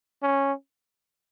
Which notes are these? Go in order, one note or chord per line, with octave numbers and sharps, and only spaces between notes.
C#4